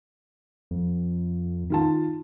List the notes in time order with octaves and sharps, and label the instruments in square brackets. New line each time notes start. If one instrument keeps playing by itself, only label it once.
[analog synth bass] F2
[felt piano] D#3 F4 A5